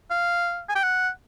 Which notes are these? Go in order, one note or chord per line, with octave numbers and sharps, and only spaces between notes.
F5
G#5
G5
F#5